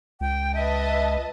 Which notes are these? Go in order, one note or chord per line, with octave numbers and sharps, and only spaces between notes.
C#2 G5
B4 D#5 E5 A5